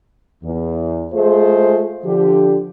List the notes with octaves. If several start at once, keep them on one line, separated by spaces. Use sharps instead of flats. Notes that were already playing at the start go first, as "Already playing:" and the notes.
E2
G#3 A3 F4 G#4 C5
D3 F3 G4